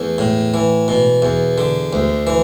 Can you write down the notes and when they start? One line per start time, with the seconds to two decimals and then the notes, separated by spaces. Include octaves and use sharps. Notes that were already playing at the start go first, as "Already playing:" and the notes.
Already playing: E2 A3
0.18 A2
0.54 E3
0.88 B2
1.22 E2
1.58 D3
1.93 D2
2.27 E3